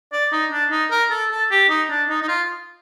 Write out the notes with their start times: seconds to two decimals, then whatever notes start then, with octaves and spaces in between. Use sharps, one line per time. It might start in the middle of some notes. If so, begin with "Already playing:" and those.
0.13 D5
0.32 D#4
0.52 D4
0.71 D#4
0.91 A#4
1.11 A4
1.31 A4
1.51 G4
1.69 D#4
1.90 D4
2.10 D#4
2.22 D#4
2.28 F4